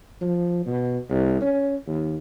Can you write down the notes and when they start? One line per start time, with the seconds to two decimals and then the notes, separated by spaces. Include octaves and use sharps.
0.21 F3
0.66 B2
1.10 C2
1.41 C#4
1.86 D#2